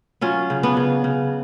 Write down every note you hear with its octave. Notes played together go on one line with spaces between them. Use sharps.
F#3 C#4 F4
C#3
B3 D4
C#3
C#3